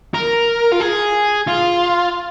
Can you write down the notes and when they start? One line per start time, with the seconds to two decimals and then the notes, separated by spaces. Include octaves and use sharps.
0.14 A#4
0.73 F4
0.81 G#4
1.47 F4